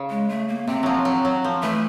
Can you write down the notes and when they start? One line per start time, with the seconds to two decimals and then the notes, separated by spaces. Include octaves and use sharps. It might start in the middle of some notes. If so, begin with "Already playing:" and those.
Already playing: C#3
0.10 G#3
0.29 A3
0.48 A#3
0.67 C3 C4
0.83 F3 F#3
1.05 F#3
1.25 F#3
1.44 F3
1.63 E3 A3